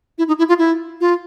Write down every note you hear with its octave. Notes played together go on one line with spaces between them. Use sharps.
E4
D#4
E4
F4
E4
F4